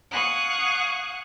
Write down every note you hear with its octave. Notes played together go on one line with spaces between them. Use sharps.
F5 F#5 G#5 C#6 D#6 F#6